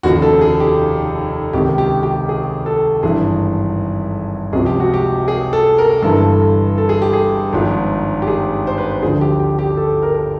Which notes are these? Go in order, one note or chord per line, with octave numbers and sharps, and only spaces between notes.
F1 D#2 C#3 F3 F#4
A4
G#4
G4
C#2 C3 D#3 G4
G4
G4
G#4
A4
G#1 G2 E3 G#4
C#2 C3 F3 G#4
G4
F#4
G4
G#4
A4
A#4
G1 G2 E3 A4
A4
G#4
G4
G#4
G#1 G#2 F3
G4
G#4
C5
B4
D2 D3 F3 G#4
G4
G4
G4
A4
A#4